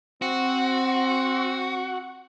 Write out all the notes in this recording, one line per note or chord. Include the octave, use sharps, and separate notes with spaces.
C4 F#4